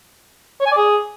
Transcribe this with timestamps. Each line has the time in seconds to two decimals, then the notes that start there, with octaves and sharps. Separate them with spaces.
0.60 C#5
0.66 G#5
0.71 D5
0.77 G#4